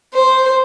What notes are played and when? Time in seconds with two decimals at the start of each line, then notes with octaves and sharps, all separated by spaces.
0.14 C5